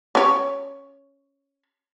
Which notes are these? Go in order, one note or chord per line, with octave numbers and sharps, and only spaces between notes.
C#4 C#5